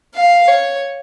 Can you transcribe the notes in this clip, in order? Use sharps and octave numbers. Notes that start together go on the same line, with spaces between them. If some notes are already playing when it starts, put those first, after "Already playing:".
F5
C#5